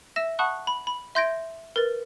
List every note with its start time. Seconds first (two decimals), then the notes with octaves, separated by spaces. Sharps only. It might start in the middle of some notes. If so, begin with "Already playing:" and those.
0.16 E5 E6 A#6 E7
0.39 F#5 A5 B5 C#6 D#6 F#6
0.67 B5
0.87 B5
1.15 E5 C6 G6 G#6 A#6 D7
1.76 A#4 B4 A6